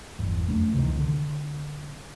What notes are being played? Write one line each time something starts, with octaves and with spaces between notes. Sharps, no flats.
G1 E2
F2 A3 A#3 D4
C#2 C3 D#3 E3
D3